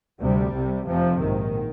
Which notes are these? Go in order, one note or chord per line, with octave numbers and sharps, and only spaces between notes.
D2 C3 G3
C2 C3
F1 F2 C3 F3
A#1 G#2 D#3